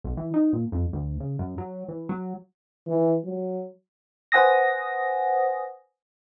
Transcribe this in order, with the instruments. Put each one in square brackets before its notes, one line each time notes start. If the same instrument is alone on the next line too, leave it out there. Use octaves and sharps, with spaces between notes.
[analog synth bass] B1
E3
D#4
A#2
F2
D2
C#3
F#2
F#3
E3
F#3
[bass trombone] E3
F#3
[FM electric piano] B4 C5 F#5 G#5 D#6 A#6